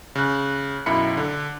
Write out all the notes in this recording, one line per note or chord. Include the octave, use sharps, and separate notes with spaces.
C#3 F#6
B1 F#2 E4 B5 C#7
D3